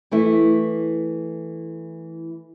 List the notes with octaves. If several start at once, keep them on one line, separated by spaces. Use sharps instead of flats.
E3 A3 E4